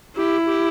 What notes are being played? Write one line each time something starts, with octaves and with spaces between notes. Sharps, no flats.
E4 G4
G4